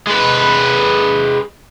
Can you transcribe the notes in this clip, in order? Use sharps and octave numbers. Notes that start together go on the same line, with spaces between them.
G#3 B4